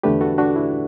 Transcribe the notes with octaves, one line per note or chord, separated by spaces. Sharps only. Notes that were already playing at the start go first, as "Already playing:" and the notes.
E2 D3 A3 D4 G4 B4
F#4 A4
D4 F#4
E4